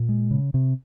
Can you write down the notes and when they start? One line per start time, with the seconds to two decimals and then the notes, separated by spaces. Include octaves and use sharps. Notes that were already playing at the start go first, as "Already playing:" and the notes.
Already playing: A#2
0.09 G#3
0.31 C#3
0.54 C3